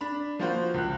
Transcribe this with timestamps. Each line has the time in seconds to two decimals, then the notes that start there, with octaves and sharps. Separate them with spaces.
0.01 D4 B5
0.39 F3 A#3 F4 F#4 C5
0.74 C#2 F#6